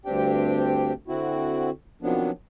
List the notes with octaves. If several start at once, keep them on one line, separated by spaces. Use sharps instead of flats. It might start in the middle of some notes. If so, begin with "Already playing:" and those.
D2 G2 C4 D4 G4 G5
D3 C4 E4 F#4
C3 D#3 F3 F#3 B3 D4